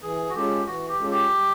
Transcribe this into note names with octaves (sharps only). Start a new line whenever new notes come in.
E3 G#4
F#4
G#3 C#4 F4 G4 A4
E3 F#4
G4
G#3 C#4 F4 A4
G4
G3